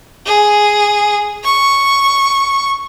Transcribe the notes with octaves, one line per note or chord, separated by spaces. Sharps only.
G#4
C#6